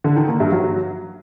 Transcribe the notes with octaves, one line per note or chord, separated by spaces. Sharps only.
D3
D#3
A#3
G2
F#3